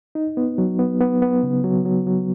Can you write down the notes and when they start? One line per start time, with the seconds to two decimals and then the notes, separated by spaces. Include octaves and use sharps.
0.15 D#4
0.37 B3
0.58 F#3
0.79 B3
1.01 B3
1.22 B3
1.43 C#3
1.64 F#3
1.85 F#3
2.07 F#3